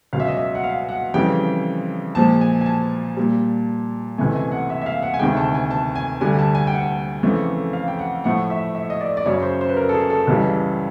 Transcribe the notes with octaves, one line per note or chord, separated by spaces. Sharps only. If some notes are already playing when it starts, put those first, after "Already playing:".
C#2 B2 F#3 F5
E5
D#5
E5
F#5
F5
F#5
F2 C#3 E3 G3 G5
A#2 F3 G#3 A5
G#5
G#5
A5
A#2 G3
C#2 C3 E3 A3 G#5
G#5
F#5
E5
E5
F5
F#5
G#5
D2 C3 D#3 G#3 G5
A5
G#5
A5
G#5
D2 D3 G3 G#5
A5
G#5
G5
F#5
F2 C#3 E3 A3
F5
G5
F#5
A2 F3 A3 F#5
E5
E5
D#5
D5
D5
F#2 C#3 F#3 C#5
C5
C5
B4
A#4
A4
G#4
A4
C#2 C#3 E3 G3